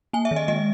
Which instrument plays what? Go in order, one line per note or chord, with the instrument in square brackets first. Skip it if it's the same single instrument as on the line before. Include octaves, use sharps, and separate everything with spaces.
[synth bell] A#3 G#5
E5
D#3
D#5
G#3 D#5